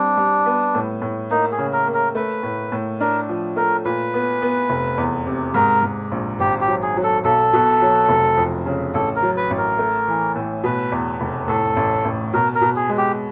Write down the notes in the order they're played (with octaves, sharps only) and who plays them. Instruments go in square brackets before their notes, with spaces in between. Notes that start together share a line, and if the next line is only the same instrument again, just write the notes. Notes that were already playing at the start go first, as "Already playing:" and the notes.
Already playing: [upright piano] G3 C4 [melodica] D4
[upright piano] G3
B3
A2
A2
[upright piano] A#3 [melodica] D#4
[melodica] G#4
[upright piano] C#3
[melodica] A#4
[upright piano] A#3
[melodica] A#4
[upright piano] A3 [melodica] B4
[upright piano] A2
A2
[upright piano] D4 [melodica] A#4
[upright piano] F3
[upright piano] A3 [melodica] A#4
[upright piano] A#2 [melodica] B4
[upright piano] B3
B3
F1
E2
C3
[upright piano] G#2 [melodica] A#4
[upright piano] G#2
A#1
[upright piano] G#1 [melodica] G4
[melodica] G4
[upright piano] F#3
[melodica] G#4
[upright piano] F#3
[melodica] A4
[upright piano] B1 [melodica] A4
[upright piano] B2
F#3
F1
F2
C#3
[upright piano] A1 [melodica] A4
[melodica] A#4
[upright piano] F#3
[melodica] B4
[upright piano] A1
[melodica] A#4
[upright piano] A3
E3
A2
[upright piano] B2 [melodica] B4
[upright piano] E2
F1
[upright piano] A2 [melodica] A4
[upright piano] A1
A1
[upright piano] B2 [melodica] A#4
[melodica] A#4
[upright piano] B2
[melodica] G#4
[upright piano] G#3
[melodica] G4